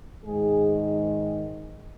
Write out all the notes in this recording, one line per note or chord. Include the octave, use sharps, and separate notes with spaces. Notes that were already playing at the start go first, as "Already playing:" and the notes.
G#2 D#3 G#3 G#4